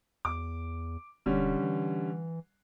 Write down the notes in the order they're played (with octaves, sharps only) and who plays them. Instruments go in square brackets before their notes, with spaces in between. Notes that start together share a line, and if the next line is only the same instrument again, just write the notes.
[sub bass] E2 [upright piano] D6
[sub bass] E1 [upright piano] D3 G3 C#4
[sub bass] E3